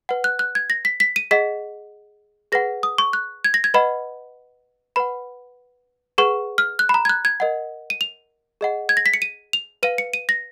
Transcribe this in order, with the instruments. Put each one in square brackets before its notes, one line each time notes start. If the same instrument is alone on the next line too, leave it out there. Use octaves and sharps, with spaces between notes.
[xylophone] B4 F#5
F#6
F#6
G#6
A#6
B6
B6
D#7
G#4 D#5 F#5 B6
G#4 B4 F#5 A#6
D#6
C#6
F#6
G#6
A#6
G#6
B4 D#5 F#5 B5
B4 F#5 B5
G#4 B4 F#5 C#6
F6
F#6
B5
A#5
G#6
F#6
G#6
A#4 D#5 F#5
D#7
F7
G#4 D#5 F#5
G#6
A#6
B6
C#7
D#7
F7
B4 F5 D#7
C#7
D#7
A#6